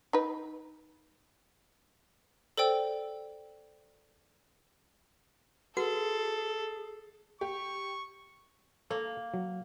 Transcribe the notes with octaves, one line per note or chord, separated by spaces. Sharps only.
D#4 B4
A4 C5 D5 G5 E6
F#4 G#4 A4 B4 F#5
G4 C#6
A#3 A4 C#5
F#3